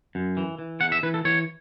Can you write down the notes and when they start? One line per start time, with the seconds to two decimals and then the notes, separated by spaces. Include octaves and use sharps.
0.15 F#2
0.37 E3
0.59 E3
0.81 E2 F#5
0.92 E5
1.03 E3 B4
1.14 A4
1.25 E3 C#5